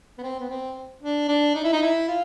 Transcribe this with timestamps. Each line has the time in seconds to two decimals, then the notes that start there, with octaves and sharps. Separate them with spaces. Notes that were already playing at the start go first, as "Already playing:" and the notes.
0.18 B3
0.23 C4
0.40 B3
0.50 C4
1.02 D4
1.29 D4
1.55 D#4
1.64 E4
1.73 D#4
1.82 E4
2.08 F4